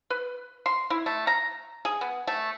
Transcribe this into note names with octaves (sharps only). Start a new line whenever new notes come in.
B4
C6
E4
A3
A#5
G#4
B3
A3